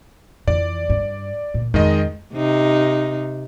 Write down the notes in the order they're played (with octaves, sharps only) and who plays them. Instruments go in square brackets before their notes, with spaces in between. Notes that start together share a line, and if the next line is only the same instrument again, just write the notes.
[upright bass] F2 E3 [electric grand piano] D5
[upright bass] G2
A#2
[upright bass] F2 [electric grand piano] D#3 G#3 D#5
[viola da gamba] C3 D#4